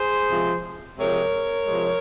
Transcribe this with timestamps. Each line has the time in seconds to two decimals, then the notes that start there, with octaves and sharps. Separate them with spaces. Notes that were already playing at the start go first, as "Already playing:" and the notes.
Already playing: G#4 C5
0.30 C3 F3 G#3
0.98 C3 F3 G#3 A#4 C#5
1.66 C3 F3 G#3